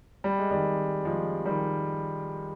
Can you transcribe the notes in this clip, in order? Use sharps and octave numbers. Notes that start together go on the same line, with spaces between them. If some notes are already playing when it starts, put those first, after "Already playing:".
G3
G#3
D#3 G3
F3 G#3
D#3 G3